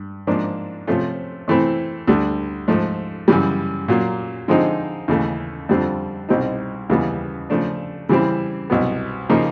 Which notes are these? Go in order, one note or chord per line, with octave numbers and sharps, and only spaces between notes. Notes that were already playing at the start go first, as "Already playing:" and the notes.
Already playing: G2
G#2 F3 A#3 D4
C3 F3 A3 C#4 F4
C3 E3 A3 C4 E4
D2 D3 G3
G#2 F3 A3
F#2 C#3 E3 G3
A#2 F#3 A#3
D3 F3 G#3 C4 D#4
D#2 C#3 E3 A3
F2 D3 G3 C4 F4
C2 B2 G3 C4 D#4
D#2 C#3 E3 G3 B3
C#3 F3 A3 D4
C#3 E3 G3 C4 E4
C2 B2 F#3 B3
C#3 F3 A#3 D#4